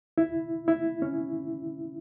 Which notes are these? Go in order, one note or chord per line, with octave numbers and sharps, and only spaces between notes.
E4
E4
C#4